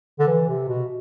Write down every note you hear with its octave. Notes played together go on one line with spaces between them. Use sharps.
D3
E3
C3
B2